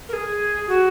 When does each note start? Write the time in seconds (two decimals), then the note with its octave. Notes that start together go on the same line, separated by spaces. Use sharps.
0.09 A#4
0.13 G#4
0.69 F#4